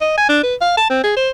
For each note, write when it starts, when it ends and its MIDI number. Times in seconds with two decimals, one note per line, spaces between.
0.01 0.14 75
0.17 0.26 80
0.29 0.41 62
0.43 0.55 71
0.61 0.73 77
0.77 0.85 81
0.90 0.99 60
1.04 1.13 68
1.17 1.30 72